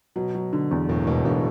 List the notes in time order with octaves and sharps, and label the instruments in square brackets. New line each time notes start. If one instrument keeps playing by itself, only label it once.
[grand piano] B2 [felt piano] F#3
[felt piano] F#3
D3
E2
[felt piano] E1 [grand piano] A2
[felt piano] E1 [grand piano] B2
[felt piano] E1 [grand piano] D3